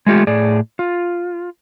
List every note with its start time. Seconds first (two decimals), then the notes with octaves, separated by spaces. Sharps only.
0.06 G#3 A3 F4 G4
0.27 A2 G#4 D5
0.79 F4